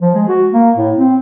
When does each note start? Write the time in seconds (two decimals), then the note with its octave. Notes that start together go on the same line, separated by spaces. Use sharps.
0.01 F3
0.15 G#3
0.28 F#4
0.53 A#3
0.77 A2
0.98 C4